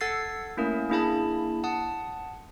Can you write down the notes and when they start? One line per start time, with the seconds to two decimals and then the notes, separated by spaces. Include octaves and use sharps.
0.01 A4 F#5 E6 G#6 A6 C7
0.57 A3 A#3 C#4 E4 A#4
0.90 A#3 D4 E4 G#4 A5 B5
1.64 F#5 A5 D#6